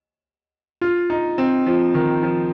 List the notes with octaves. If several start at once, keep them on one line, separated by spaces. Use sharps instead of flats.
F4
D#4
C4
F3
D#3
F3